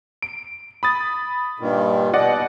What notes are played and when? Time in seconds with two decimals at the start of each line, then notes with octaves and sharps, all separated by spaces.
0.22 D7
0.83 B5 D#6 A6
1.60 G2 A#2 D#3
2.14 B2 D5 D#5 F#5